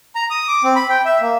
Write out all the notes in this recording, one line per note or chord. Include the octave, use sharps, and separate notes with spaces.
A#5
D#6
D6
C4
B5
G5
E5
A#3